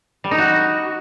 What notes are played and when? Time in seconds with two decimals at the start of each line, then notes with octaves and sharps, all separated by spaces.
0.24 G3
0.31 D#4
0.38 F#4